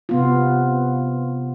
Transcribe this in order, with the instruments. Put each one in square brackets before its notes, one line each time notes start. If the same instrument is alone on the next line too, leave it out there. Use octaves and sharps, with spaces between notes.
[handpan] C3 B3 F4